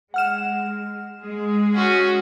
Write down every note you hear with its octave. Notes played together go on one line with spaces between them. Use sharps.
G#3 F#5 F6 E7
G#3 G#4
C#4 F#4